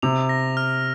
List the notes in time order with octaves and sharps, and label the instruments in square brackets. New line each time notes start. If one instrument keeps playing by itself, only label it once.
[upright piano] C3 [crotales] F7
[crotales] A#6
F6